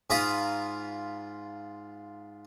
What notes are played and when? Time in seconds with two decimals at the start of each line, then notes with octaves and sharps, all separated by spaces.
0.10 G#2 F4 A#5 B5 D#6